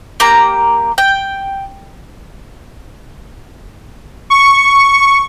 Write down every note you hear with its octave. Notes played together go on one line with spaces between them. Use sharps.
A#3 G4 A#5
G5
C#6